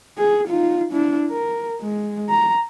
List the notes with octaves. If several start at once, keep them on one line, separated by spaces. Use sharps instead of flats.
G#4
D#4 F4
D4 E4
A#4
G#3
A#5